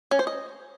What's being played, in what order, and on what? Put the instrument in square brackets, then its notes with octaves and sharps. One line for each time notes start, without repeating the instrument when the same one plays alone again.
[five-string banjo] C#4
C5
D#5